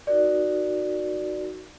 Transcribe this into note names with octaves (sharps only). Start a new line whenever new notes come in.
D#4 F#4 A#4 D5